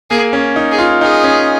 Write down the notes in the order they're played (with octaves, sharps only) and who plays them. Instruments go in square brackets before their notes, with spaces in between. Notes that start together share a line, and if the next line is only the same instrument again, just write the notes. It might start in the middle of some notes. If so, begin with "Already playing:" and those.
[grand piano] A#3 [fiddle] G#4
[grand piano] C#4
D#4
[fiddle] G#4
[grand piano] F4
[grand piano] D#4 [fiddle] G#4
[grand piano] C#4